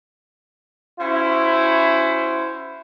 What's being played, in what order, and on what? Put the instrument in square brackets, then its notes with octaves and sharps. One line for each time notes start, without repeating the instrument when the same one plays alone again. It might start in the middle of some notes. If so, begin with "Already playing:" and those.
[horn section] C#4 E4 F#4 C5